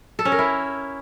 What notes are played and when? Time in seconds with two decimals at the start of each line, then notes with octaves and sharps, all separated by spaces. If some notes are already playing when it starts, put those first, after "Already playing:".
0.19 A4
0.25 C#4
0.32 A#4
0.38 E4